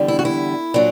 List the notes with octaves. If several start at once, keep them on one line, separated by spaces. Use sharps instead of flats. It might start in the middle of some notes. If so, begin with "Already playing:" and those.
Already playing: E2 D3 G3
E4
F#4
E4
A#2 F#3 D4